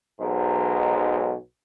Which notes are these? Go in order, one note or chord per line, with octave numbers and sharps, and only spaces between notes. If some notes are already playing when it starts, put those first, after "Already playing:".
B1 G#2 F#3